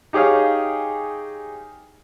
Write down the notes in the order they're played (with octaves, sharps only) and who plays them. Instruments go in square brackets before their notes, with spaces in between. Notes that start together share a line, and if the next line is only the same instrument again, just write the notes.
[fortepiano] D#4 G4 G#4 C#5 F5